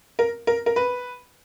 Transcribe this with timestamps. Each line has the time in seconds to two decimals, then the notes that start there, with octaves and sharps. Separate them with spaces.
0.19 A#4
0.47 A#4
0.66 A#4
0.76 B4